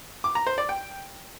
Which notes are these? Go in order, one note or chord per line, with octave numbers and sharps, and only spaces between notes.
D6
A#5
C5
D5
G5